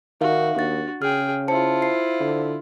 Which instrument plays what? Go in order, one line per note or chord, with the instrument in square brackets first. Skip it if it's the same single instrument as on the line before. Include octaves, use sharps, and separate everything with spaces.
[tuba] D#3 [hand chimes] D#4 E5 F5 [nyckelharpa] F#4
[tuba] D#2 [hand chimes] D4 A6 [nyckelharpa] F#4
[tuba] C#3 [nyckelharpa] G#4 G5 [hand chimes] F6
[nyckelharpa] E4 F4 [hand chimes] C5 A5 C#7
[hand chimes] C5 F5 C7
[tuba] D3